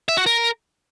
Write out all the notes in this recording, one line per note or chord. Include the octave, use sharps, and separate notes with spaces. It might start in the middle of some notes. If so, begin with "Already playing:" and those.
E5
F#4
A#4